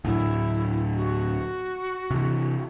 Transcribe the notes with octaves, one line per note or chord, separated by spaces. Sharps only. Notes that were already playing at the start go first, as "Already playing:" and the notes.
D2 A2 F#3 E4
F#4
C3 E3